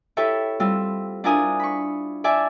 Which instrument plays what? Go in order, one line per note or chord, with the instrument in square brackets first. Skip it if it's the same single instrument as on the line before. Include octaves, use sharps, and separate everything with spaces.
[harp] E4 G4 A4 B4 C#5 E5
G3 C4 F4 E6
D4 E4 F4 A#4 G#5 D#6
B5 C#6
D5 E5 G#5 A5